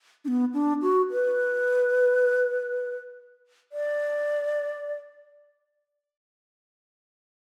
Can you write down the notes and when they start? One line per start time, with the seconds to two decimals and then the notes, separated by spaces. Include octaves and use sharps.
0.25 D4
0.28 B3
0.53 D4
0.82 F#4
1.11 B4
3.72 D5